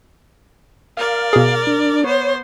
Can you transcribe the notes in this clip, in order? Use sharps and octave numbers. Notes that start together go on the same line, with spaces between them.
A#4 D5 F5
B2 G#4
D4
B3 C5 C#5